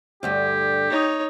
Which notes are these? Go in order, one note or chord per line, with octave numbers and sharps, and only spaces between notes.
D2 G2 D3 G4
D#4 C#5